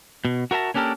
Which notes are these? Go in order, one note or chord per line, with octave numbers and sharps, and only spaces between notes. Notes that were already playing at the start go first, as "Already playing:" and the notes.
B2
F#4 A#4 E5 A5 A#5
A#3 C#4 D4 G4 A4 A#4